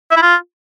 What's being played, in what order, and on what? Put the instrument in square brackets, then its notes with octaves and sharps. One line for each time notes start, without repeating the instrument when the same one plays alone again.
[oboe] E5
E4
F4